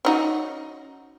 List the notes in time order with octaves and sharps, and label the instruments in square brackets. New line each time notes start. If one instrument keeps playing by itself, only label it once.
[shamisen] C#4 D#4 F#4